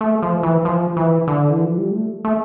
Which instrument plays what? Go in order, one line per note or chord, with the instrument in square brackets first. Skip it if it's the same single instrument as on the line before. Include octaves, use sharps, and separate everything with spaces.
[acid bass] A3
F3
E3
F3
E3
D3
E3
F3
G3
A3
A3